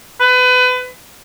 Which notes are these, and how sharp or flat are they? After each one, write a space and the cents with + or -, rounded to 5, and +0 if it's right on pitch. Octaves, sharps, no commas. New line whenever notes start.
B4 +30